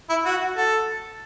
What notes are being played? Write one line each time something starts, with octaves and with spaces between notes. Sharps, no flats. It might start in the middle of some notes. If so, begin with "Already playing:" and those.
E4
F#4
A4